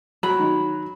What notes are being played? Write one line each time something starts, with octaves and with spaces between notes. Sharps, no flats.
F#3 B5
D#3 D#4 F#4